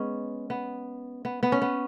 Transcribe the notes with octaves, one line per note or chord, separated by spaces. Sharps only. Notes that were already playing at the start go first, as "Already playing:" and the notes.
Already playing: G#3 B3 C#4
B3
B3
B3
C#4
B3